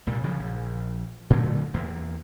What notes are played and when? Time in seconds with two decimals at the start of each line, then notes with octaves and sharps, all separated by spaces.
0.07 C2 A#2 G3
0.24 C#3 F3 F#3
0.39 A#1
1.30 A#2 D3 F#3 A3
1.74 E2 A#3